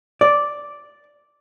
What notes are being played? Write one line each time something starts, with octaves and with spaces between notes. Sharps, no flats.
D5